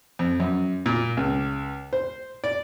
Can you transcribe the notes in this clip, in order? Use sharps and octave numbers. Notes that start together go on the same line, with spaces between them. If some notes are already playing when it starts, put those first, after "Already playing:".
F2
F#2
A#2
C#2
C5
D5